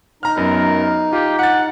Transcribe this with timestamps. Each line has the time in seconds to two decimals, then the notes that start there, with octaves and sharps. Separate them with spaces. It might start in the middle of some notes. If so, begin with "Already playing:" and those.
0.23 D#4 A#5 F6
0.37 F#2 B3 A#4
1.13 F4 G4
1.39 F#5 A6 C#7